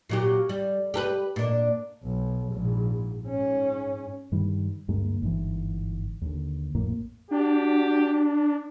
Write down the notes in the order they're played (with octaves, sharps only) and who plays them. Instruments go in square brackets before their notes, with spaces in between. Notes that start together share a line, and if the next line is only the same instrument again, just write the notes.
[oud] A#2 F#3 G4
G3
G4 A4 B4
A#2 D4
[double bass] B1
A#1 G#2
G#2 C#4
[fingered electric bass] G2 D#3 G3
D2 G2 G#3 A#3
G1 G#2 E3
D#2 D3
A#1 F2 A2 A#3
[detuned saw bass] D4 [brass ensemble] F#4 G4